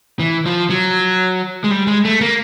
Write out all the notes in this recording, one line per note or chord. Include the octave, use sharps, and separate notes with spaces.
E3
F3
F#3
G#3
G3
G#3
A3
A#3